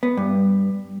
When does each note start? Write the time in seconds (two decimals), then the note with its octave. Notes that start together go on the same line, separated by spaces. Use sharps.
0.03 B3
0.17 G2